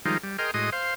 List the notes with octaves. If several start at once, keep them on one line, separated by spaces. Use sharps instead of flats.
D#3 F3 G3 G#3 D#4 F4
G3
G#4 A#4 D#5 G5 C6 F6
A2 G#3 F#4 D#5 C6 D#6
C5 F5 C6